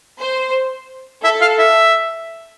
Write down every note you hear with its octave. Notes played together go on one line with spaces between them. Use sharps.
C5
A4 E5
F5
E5